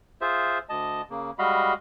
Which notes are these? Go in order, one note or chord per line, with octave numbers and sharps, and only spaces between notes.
F4 G#4 C5 E5
D2 D#5 A5
C#3 A#3
G3 G#3 F#4 D#5 F5 B5